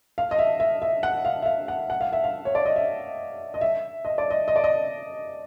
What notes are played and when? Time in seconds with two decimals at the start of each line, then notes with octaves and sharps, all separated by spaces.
0.18 F5
0.31 D#5
0.39 E5
0.60 E5
0.82 E5
1.03 F#5
1.25 F5
1.42 E5
1.46 F5
1.68 F#5
1.90 F#5
2.01 F5
2.13 E5
2.24 F5
2.45 C#5
2.55 D5
2.65 D#5
2.76 E5
3.54 D#5
3.61 E5
4.05 D#5
4.18 D5
4.31 D#5
4.48 D#5
4.56 D5
4.64 D#5